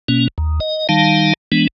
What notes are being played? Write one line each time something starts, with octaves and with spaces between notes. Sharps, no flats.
B2 A#3 C#4
D#2
D#5
D#3 G3 D#4 F5 A5
E3 G#3 B3 D4